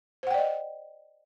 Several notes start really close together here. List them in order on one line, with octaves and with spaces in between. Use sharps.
C5 F#5 G5 D5 D#5